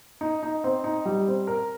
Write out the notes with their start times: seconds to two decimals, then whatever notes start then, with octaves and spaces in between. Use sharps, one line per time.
0.21 D#4
0.43 D#4
0.64 C4
0.84 D#4
1.06 G3
1.27 C4
1.47 A#4